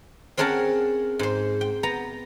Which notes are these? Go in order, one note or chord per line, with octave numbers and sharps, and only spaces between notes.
C4 C#4 G#4 A#4 F#5 A5
G#2 C5
G5
B3 A#5